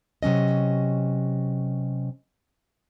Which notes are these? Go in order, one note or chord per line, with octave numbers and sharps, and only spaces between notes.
C3 F#3 C#4 D#5